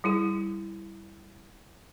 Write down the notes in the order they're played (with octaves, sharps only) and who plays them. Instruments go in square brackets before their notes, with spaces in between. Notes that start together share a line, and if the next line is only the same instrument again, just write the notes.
[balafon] G3 E4 G#4